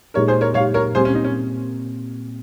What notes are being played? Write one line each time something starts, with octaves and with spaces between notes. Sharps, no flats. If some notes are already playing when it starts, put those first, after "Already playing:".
A#2 G#3 D#4 G4 A#4 C#5
G#4 C5
A#4 C#5
A#2 G#3 D#4 G4 C#5 F5
A#4 C#5
A#2 G3 C4 G4 G#4 C5
C#4
D#4
C#4